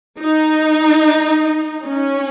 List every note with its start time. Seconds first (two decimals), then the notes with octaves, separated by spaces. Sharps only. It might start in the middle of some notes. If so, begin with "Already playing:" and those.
0.19 D#4
1.84 C#4